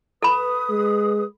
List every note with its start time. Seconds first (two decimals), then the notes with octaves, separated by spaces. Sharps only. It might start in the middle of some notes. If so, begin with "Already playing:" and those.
0.22 A4 B4 B5 D#6
0.70 G#3